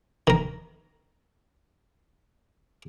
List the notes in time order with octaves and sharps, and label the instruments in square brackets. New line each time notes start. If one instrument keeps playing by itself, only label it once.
[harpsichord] D#3 A#4